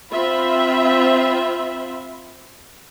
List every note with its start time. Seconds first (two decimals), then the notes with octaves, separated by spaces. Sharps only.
0.12 C4 F4 C5 E5 B5